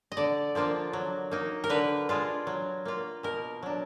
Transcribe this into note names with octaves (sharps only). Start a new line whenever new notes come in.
D#5
D3 D5
F3 A#3 D4 F4
F#3
A#3 D#4
A#4
D3 B4
G#3 D4 F4
F#3
A#3 F4
B2 A#4
F#3 D4